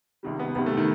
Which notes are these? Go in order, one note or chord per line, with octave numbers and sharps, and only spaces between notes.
C#2 C3 D#3 G3
B3
C#2 C3 D#3 G3 B3
A3
D#3